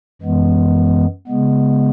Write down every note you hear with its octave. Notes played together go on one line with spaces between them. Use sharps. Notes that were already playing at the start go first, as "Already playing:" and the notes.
F#2 E3 G#3 B3
C#3 G#3 B3